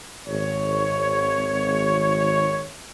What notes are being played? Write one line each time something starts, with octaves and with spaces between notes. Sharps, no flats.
G#1 C#5